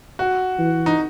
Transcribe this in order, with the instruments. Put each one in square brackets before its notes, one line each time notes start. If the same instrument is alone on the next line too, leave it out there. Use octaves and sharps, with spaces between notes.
[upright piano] F#4
[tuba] E3
[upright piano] D#4